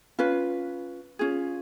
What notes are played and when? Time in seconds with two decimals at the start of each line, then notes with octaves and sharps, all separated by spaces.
0.19 C#4 F4 B4
1.19 C#4 F4 G#4